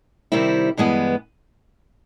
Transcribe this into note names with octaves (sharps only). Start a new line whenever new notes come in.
C3 D#3 G3 C4 E4
G2 E3 G#3 B3